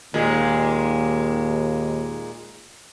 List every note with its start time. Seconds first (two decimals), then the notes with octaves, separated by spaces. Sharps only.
0.14 D#2 A#2 G#3